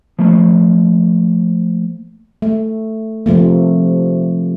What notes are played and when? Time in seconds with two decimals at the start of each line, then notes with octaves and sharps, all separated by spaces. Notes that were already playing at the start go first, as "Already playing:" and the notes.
0.19 F3 A3 A#3
2.42 A3
3.26 C3 F3 A3 A#3